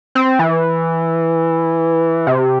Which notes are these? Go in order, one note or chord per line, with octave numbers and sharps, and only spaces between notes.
C4
E3
C3